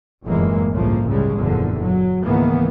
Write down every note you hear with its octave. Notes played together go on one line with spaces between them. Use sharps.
F1 F#2 A2 E3 G#3 A#3
G1 C2 A2 C#3 F3 A#3
C#2 C#3 G3 G#3
F#1 E2 A#2 D3 F3
F#3
C#2 G#2 D#3 E3 A#3 B3